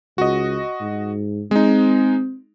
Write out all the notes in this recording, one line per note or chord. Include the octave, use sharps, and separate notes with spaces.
C#2 F#4 D#5
G#2
G#3 C4 D#4